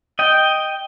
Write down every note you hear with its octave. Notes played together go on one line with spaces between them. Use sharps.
D#5 G5